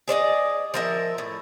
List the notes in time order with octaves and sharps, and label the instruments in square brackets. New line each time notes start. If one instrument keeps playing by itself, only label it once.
[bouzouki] G#4 C5 D5 D#5
F3 A#4 E5
A2